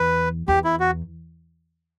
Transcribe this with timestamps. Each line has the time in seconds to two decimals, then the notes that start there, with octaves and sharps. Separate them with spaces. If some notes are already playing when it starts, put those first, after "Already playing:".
Already playing: E2 B4
0.48 E2 G4
0.64 E4
0.80 F#4